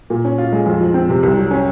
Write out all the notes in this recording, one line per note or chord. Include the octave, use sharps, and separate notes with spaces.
A#2
C#4
F4
G#3
F2
F3
C4
C3
C2
F#3
C#4